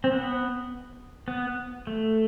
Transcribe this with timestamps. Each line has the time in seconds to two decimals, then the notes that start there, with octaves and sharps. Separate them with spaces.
0.04 C4
0.12 B3
1.28 B3
1.87 A3